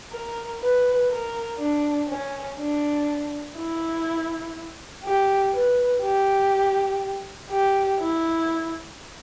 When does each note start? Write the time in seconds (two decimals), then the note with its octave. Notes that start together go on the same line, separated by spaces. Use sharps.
0.11 A#4
0.61 B4
1.09 A#4
1.59 D4
2.09 C#4
2.57 D4
3.56 E4
5.04 G4
5.53 B4
6.02 G4
7.50 G4
7.99 E4